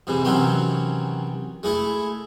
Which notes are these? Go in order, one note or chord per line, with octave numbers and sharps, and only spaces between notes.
G#2 C3 E3
C3 D#3 E3 F#3 C4 C#4
G#3 A3 E4